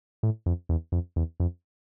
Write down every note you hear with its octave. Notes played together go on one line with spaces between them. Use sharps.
A2
F2
E2
F2
E2
F2